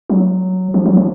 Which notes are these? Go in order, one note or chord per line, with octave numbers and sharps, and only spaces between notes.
F#3
F3
F#3
F3